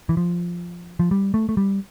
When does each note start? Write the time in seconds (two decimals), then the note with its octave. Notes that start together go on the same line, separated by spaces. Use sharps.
0.09 E3
0.17 F3
1.00 F3
1.11 G3
1.34 A3
1.49 A3
1.57 G3